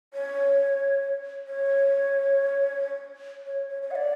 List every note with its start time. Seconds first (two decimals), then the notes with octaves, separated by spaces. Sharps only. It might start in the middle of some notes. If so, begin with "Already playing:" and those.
0.14 C#5
1.48 C#5
3.46 C#5
3.69 C#5
3.83 C#5
3.91 F#5
3.95 D5